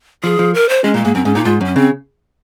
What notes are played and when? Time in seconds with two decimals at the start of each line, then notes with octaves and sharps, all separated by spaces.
0.24 F3 G#4
0.39 F3
0.54 A#4
0.69 C5
0.84 G#3 C#4
0.94 A#2 G#3
1.04 G#2 A#3
1.15 F#2 C4
1.25 G#2 C#4
1.35 A#2 D#4
1.45 G#2 F4
1.61 F#2
1.66 C#4
1.76 C#3 C4